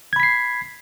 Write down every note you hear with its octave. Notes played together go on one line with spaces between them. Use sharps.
B5 G#6 B6 C7